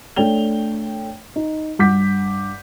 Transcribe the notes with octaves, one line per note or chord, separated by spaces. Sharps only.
A3 D4 C#5 G5 F7 G7
D#4
G2 F#5 D6 G6 B6